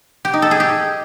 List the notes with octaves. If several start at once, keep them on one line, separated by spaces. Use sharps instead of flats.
G4
D#4
A4
G#4
G4